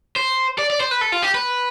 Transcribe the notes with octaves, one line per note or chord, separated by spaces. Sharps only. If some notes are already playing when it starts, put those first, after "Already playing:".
C5
D5
D5
C5
B4
A4
F4
G4
B4